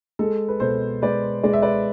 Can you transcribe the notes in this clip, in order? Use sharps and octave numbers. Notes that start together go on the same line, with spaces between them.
G#3 A4
B4
B2 A4 C5
G#3 B4 D5
G#3 D5
E5
B4 D5